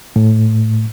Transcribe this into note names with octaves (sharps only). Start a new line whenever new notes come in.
A2